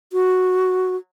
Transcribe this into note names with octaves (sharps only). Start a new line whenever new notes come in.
F#4